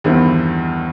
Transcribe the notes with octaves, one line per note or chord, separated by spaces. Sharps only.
E2 G2 D#3 C4 E4